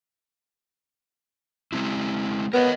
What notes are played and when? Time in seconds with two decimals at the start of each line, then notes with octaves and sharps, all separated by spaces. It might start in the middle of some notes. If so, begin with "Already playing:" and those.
1.73 G#3 C4 E4
2.53 B3 A#4 C#5 D#5